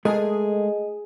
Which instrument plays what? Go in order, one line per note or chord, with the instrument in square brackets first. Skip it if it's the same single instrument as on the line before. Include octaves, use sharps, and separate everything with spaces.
[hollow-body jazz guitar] G#3 A3 A#4 [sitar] G#4 [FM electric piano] D#5